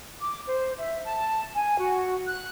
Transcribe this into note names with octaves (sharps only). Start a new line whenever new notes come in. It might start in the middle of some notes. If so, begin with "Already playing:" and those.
D6
C5
E5
A5
G#5
F#4
F#6